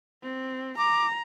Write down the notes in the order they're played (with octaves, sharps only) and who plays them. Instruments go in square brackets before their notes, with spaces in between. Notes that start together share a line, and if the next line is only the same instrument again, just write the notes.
[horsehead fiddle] C4
[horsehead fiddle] A#5 [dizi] D6